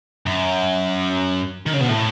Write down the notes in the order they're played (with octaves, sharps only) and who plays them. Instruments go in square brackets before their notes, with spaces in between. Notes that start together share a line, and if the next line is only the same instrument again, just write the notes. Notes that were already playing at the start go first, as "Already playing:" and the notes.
[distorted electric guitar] F#2
D#3
C#3
B2
A2